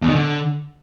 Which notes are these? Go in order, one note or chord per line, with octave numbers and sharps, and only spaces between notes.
E2
D#3
D3